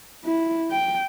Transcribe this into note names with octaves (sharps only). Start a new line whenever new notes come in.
E4
G5